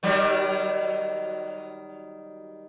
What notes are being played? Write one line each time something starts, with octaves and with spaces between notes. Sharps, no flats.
D#3 F#3 G3